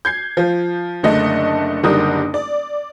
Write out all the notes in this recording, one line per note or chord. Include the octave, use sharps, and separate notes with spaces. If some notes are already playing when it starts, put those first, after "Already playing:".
G6 G#6 C7
F3
F#1 D3 A3 D#5
F#1 D3 G3 D#4 A#4 D#6
D5